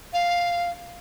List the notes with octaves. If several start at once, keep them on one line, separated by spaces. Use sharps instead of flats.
F5